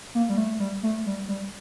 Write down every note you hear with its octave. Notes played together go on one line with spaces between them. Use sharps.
A#3
G3
A3
G3
A3
G3
G3